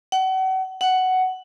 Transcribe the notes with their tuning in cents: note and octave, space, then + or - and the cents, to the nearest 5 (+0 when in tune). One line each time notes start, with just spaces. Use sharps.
F#5 +35
F#5 +10